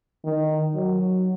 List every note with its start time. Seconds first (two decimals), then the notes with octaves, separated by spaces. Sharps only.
0.24 D#3
0.75 F#3